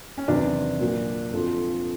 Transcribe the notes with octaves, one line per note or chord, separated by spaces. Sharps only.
C#4
E2 C3 D#3 F#3 D4
A#2 F#3
F2 D3 F3